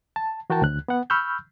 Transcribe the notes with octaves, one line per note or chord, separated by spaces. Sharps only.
A5
E3 F#4 A#4 G5 A5
D2 F#6
B3 F#5
B5 C#6 E6 F6 G6